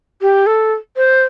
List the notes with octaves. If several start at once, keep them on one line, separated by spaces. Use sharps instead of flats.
G4
A4
C5